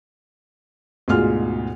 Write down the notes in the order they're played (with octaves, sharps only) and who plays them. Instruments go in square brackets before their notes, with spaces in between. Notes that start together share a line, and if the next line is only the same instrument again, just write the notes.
[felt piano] D2 G#2 B2 F4 G#4 F6